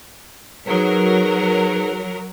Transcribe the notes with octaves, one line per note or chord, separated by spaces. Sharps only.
F#3 D#4 G#4 A#4 B4